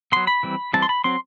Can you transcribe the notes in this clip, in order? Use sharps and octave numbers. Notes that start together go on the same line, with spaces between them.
F#3 B3 C6
B5
E3 G3 C4
E3 G3 C4 A5
C6
B5
F#3 C4 C6